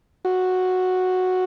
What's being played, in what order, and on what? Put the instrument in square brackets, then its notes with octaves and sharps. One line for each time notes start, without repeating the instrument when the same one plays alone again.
[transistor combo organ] F#4